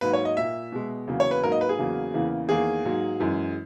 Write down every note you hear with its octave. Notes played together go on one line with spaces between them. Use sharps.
G#2 F#3 A#3 B4
C#5
D#5
A#2 A#3 E5
B2 G#3
E2 C#3 F#3 A#3
C#5
B4
G#2 F#3 A#3 A#4
D#5
B4
G#4
E2 C#3 F#3 A#3
E2 C#3 E3 A#3
E2 D#3 A#3 G#4
G#2 F#3 A#3
F#2 E3 G#3